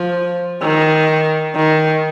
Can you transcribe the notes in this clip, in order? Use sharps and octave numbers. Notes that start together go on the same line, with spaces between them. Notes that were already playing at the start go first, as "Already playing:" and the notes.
Already playing: F3
D#3
D#3